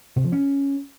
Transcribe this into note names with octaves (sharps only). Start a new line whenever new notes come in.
C3
F3
C#4